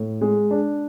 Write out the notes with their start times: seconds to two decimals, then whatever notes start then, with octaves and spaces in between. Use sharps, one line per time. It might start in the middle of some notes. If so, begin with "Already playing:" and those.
Already playing: A2
0.21 G#3
0.51 D4